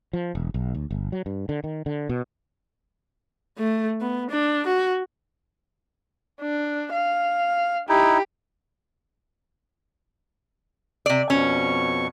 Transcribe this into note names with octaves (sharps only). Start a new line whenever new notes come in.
F3
E1
B1
D2
G1
F#3
G2
D3
D#3
D3
B2
A3
B3
D4
F#4
D4
F5
D#4 E4 G4
C3 D5
F2 B2 C#4 C#6